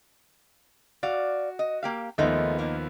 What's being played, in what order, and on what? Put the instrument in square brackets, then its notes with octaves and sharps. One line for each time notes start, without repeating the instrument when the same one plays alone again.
[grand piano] F#4 [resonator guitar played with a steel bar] D5 F5
[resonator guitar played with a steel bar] D#5
A#3 G4 F5
[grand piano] D#2 F3 B3 [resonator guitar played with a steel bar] G#3 A3 D#4
[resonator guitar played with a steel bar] A#3 D#4